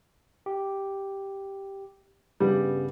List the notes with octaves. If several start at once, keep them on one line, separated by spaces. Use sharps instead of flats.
G4
G2 C#3 G3 B3